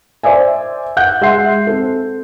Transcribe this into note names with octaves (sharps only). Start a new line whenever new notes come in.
C5 D5 E5 G#5
F#5 F#6 G6
G#3 E5 F#5 C6 C7
C4 A4